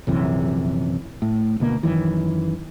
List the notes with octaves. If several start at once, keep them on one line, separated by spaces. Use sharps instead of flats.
A#1 F#2 C3 E3
A2
D2 B2 A#3
F#2 D#3 E3